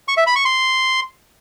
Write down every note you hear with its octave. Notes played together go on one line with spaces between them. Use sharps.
C#6
E5
B5
C#6
C6